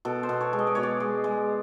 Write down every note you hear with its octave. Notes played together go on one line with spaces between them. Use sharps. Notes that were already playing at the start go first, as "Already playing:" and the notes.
B2 A4
C5
B2
C#5
G#3
D#5
D5
B2 C#5
D5
G#3
G#3